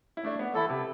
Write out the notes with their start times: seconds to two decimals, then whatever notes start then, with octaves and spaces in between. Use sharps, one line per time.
0.17 E4
0.24 A3 D4
0.39 B3
0.55 E3 E4 A4
0.70 C3